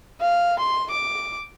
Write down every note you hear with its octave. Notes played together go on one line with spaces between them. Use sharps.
F5
C6
D6